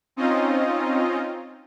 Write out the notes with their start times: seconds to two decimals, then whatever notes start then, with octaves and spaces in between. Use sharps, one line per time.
0.16 C4 C#4 D#4 F4 D#5